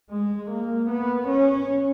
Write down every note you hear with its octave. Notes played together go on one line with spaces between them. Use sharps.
G#3
A#3
B3
C#4